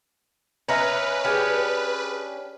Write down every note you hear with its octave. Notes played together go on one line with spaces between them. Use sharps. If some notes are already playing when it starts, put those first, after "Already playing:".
C#4 A#4 B4 C#5 D#5 E5
C#4 D4 G4 G#4 F6